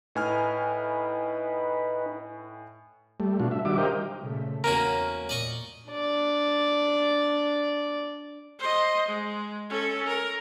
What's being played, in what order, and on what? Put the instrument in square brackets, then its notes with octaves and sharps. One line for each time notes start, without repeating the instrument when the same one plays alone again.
[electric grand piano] A2 G#5 F6 [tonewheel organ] D#4 B4
[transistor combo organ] G3 A3
B2 A3 D4 F4 F#4
E5
D#3 G3 D4 F#4 E5 D6
G4 A#4 C5 D#5 F5 G5
[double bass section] A#2 C#3 A3
[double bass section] E2 [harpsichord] A#3 C#4 F#4 [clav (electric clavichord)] A#4
[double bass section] A#2 [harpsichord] D5 D#5 C#6
[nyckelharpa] D4 D5
[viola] C5 D#5
G#3
C#4 A4
A#4